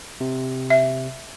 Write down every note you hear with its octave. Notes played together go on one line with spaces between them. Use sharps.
C3
E5